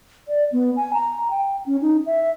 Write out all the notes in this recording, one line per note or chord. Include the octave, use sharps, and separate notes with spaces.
D5
B3
G#5
A#5
G5
C#4
D#4
E5